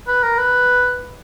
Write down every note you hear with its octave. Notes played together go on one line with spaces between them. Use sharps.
B4
A#4
B4